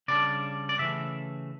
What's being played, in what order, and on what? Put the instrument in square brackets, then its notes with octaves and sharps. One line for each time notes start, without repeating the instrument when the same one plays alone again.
[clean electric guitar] C#3 G3 D4 D5
D5
C#3 E3 A3 E5